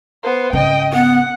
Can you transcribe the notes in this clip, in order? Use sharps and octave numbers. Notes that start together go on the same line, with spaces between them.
B3 C5
G#1 C#3 D#5 G5
B3 F#5